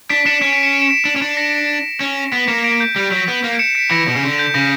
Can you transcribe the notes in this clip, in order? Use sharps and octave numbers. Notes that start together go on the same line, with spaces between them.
D4 B6 D7
D4 C#7 E7
C#4 B6 D7
B6 D7
C#7 E7
D7
E7
B6 D7
D4
C#4
D4
A#6 C#7
C#4
B3 B6
A#3 C#7 E7
B6 D7
G6
G3 A#6
F#3 B6 D7
B3
A#3
D7
C#7 E7
B6 D7
E3 A#6 C#7
B2
C#3
D3
G6
C#3 A#6